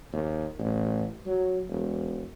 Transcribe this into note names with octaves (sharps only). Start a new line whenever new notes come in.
D#2
A1
F#3
E1